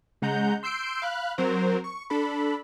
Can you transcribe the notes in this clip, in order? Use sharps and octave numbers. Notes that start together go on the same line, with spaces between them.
C#3 G#3 F#5 A#5 G6
C6 E6 G6 C7 D7
F5 B5 F#6
F#3 C4 A#4 C5
C#6
D4 A4 B5